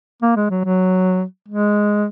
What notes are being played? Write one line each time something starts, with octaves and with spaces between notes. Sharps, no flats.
A#3
G#3
F#3
F#3
G#3